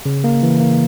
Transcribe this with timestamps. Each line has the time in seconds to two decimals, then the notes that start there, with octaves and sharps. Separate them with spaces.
0.06 C#3
0.24 A#3
0.43 E3
0.60 A#3